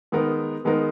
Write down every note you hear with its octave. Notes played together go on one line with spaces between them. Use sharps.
D#3 G#3 B3 D#4 A#4
D#3 G#3 B3 D#4 A#4